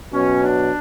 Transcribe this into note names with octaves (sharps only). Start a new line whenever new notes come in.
B2 F#3 C#4
D4